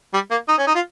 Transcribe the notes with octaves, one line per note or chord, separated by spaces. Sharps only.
G3
A#3
D#4
C#4
D#4
F4